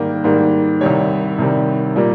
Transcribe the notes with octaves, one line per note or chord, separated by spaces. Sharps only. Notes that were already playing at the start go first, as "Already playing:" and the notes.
Already playing: G#2 D#3 G3 A#3
G#2 D#3 G3 A#3
C2 C3 D#3 G3 C#5
C2 C3 D#3 G3
A#2 G3 A#3